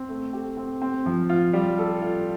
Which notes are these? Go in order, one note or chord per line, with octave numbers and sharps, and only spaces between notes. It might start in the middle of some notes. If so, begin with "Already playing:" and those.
Already playing: C4
A3
G4
C4
C4
F3
F4
G3
A4
F4